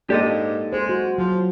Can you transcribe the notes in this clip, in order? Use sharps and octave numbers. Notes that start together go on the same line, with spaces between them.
G#2 A#3 G4 A4 D5 D#5
G#3 C5
F#4
F3 F#3